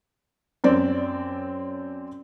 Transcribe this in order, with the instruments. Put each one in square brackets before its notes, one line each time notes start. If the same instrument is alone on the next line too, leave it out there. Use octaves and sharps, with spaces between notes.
[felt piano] F#2 C4 D5